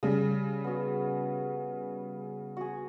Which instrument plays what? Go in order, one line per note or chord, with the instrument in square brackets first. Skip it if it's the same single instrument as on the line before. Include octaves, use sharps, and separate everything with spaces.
[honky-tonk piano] C#3 G3
[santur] B3 F#4
F#4 G#4